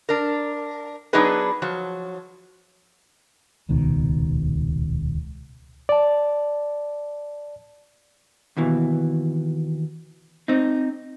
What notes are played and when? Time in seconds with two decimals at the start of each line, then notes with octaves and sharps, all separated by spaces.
0.09 D4 A#4
1.13 F#3 B3 D4 D#4 G#4 B4
1.62 F3 F#3
3.69 D#1 C#2 B2 D#3
5.89 D5 A5
8.57 D#2 B2 E3
10.48 C4 D#4